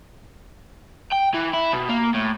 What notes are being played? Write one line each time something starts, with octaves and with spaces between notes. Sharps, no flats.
G5
E3
E4
B2
A#3
A2